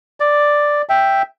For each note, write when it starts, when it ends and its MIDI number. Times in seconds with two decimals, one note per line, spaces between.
0.20 0.82 74
0.89 1.22 76
0.89 1.22 79